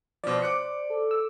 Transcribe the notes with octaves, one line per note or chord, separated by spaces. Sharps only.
B2 F3 C5 D5
D6 F#6 C#7
A4
E6